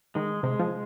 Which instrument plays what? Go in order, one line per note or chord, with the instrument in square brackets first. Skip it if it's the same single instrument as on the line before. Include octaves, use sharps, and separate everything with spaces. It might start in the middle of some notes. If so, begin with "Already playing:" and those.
[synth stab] D#3 [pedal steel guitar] G#3
[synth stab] C3 [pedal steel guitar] G#3
[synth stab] F3